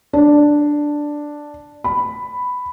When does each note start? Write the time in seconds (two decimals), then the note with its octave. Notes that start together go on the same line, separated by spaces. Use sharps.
0.13 D4
1.84 B5